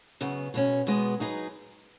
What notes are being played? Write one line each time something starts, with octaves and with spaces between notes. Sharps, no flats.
F#2 C#3 B3
B2 G#3 C#4
B2 G#3 B3
F#3 D#4 G#4 B4